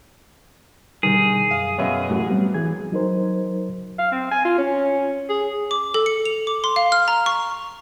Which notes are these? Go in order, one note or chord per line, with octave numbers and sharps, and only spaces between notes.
B2 D3 D#3 G3 G#4
F#2 F5
F#2 B2 C#5 E5 F5
A1 F#3 A3 A#4
G3 B3 C4
E3 G#4 G#6
F#3 D#4 A#4 C5
F5
C4
G#5
F4
C#4
G#4
D6
A4
C#7
F7
D6
C6
F5
F6
A#5
C#6